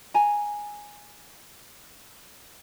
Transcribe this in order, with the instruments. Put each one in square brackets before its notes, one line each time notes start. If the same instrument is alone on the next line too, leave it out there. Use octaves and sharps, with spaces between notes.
[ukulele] G#5 A#5